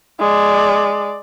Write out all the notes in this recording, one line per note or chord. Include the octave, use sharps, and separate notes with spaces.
G#3 D5